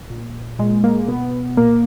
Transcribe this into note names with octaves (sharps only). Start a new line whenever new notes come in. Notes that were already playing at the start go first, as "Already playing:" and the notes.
A#2
A#2 G#3
A#3
B2 B3
A#2 A#3